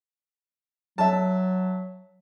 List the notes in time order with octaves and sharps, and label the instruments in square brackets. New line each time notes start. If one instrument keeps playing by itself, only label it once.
[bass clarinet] F#3 [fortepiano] E5 A5